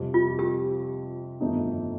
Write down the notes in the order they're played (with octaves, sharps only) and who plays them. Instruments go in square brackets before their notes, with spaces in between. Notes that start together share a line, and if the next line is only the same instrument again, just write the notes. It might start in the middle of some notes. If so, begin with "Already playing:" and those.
Already playing: [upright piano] F2 C3 G3 C4
[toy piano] F4
G4
[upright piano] G1 F2 D#3 A3 D#4